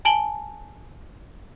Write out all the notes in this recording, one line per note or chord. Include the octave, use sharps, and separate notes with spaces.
G#5 A5 D7 F#7 G7